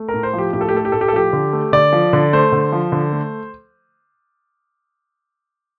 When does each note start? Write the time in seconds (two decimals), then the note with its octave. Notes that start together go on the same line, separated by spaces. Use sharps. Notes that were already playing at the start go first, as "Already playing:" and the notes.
Already playing: A3
0.08 A#4
0.14 A2
0.23 C5
0.33 F3
0.38 G4
0.53 A2 G4
0.61 A4
0.69 G4
0.73 A3 A4
0.85 G4
0.92 A2 A4
1.01 G4
1.08 A4
1.13 F3 G4
1.33 D3
1.53 A3
1.72 D3 D5
1.93 F3
2.13 D3
2.33 A3 C5
2.52 D3
2.72 F3
2.92 D3
3.12 A3